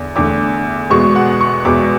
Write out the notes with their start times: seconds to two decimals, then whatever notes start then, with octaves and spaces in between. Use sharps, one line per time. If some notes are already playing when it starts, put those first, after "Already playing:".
Already playing: E2 D3
0.16 E2 D3 A3 D6
0.90 E2 B2 G#3 B3 C#6
1.15 F#5
1.41 C#6
1.65 E2 B2 G#3 B3 D6